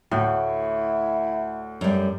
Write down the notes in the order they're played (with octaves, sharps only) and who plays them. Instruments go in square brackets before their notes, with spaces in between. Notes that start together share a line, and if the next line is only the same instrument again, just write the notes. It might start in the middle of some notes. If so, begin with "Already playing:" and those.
[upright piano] D2 [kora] A2 [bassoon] E4
[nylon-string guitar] F#2 G3